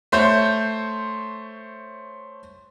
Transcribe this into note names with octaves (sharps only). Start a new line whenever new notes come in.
A3 C5 C#5 G6